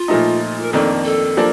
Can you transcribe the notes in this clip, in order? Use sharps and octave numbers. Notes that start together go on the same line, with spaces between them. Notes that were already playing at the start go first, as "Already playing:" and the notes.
Already playing: F4
A#2 F3 A3 D#4
A#4
F2 D#3 A#3 D4 A4
A4
F3 A#3 D4